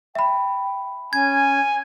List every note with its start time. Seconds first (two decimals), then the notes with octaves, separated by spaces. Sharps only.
0.15 E5 G5 B5
1.13 C#4 G#5 G#6